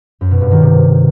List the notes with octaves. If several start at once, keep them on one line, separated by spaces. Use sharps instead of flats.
F#2
B2
G2
D#3
C3